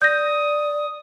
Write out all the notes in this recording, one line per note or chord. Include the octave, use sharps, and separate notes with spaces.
D5 D#6 G6 A#6